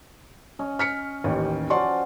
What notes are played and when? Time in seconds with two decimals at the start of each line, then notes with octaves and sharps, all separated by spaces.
0.59 C#4 C#5 D#5
0.79 F6 B6 C#7
1.24 A1 D#2
1.70 F3 C#4 F#4 D5 C6 C#6